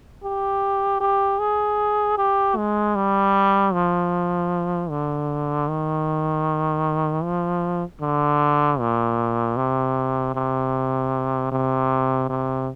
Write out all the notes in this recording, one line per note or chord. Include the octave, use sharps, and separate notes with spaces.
G4
G4
G#4
G4
G#3
G3
F3
D3
D#3
F3
D3
A#2
C3
C3
C3
C3